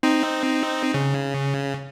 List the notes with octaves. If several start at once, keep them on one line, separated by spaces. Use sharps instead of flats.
C4 D#4
C#3